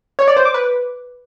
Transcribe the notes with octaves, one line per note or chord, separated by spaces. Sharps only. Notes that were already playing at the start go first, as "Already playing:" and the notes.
C#5
D5
C5
D6
B4